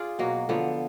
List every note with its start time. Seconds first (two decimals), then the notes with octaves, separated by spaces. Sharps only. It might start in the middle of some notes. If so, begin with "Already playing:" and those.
Already playing: F4 G#4 D5
0.19 B2 F#3 A#3
0.49 D3 F3 B3 D4